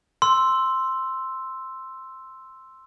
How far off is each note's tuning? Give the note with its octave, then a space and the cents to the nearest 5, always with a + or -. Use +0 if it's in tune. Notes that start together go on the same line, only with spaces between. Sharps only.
C6 +0 E6 +0